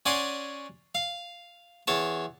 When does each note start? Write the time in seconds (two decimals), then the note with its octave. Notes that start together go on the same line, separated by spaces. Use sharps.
0.06 C#4 D5 F#5 G#5 C6
0.95 F5
1.87 E2 C#5 A5